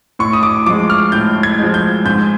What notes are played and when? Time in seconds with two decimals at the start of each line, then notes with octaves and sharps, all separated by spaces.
0.19 A2 C#6
0.33 D#6
0.43 D6
0.66 F3 G#3 D6
0.90 F6
1.12 A2 G6
1.43 G#6
1.59 F3 G#3
1.74 G6
2.05 G#2 G6